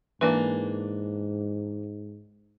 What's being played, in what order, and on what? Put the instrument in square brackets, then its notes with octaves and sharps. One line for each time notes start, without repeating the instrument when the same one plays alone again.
[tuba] G#2 [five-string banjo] E3 A#3 D4 [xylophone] B4